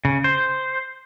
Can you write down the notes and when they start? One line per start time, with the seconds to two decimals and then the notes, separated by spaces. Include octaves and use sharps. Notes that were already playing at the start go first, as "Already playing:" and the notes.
0.05 C#3
0.24 C5